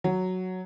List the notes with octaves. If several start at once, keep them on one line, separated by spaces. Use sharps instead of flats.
F#3